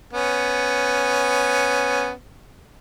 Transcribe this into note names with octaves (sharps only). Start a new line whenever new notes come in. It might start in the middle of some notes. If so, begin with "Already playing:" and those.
B3 C#4